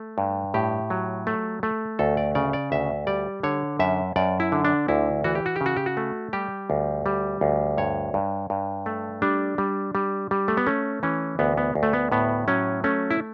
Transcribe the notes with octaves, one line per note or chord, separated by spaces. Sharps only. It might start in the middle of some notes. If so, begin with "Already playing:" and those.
Already playing: A3
G2
A2 G4
F#3
A3
A3
D2 A4
D5
C#3 D5
D5
D2 E5
G3 D5
D3 C#5
F#2 E5
F#2 D5
E4
D3
D4
D2 E4
E3 F#4
G4
F#4
G4
C#3
F#4
G4
F#4
A3
G3 G4
D2
G3
D2
G2 C#5
G2
G2
A3
G3 D4
G3
G3
G3
A3
B3
A3 C#4
E3 C#4
D2 B3
B3
D2
A3
B3
A2 B3
F#3 C#4
A3 C#4
E4